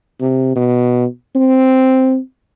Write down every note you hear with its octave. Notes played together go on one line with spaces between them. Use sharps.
C3
B2
C4